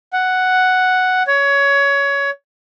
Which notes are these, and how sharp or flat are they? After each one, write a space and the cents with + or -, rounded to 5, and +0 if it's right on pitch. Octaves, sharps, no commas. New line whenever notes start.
F#5 +0
C#5 +20